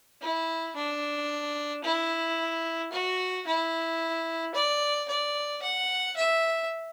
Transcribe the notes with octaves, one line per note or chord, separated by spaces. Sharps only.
E4
D4
E4
F#4
E4
D5
D5
F#5
E5